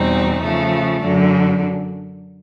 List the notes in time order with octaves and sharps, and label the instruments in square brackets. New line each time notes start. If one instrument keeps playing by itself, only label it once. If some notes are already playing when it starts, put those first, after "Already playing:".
Already playing: [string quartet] E2 B2 G3 C4 D#4
C#3 F3 A3
F#2 D3 F#3